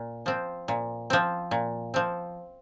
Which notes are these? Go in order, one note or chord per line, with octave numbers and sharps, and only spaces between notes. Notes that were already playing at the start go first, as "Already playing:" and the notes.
Already playing: A#2
F3 C4
A#2
F3 C4
A#2
F3 C4